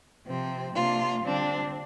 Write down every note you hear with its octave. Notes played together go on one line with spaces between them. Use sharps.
C3 F3 C4
C3 A#3 D4 F4
D3 G3 C4 D4